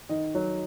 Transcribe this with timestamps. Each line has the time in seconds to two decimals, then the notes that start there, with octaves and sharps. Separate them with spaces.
0.09 D#3 D#5
0.35 F#3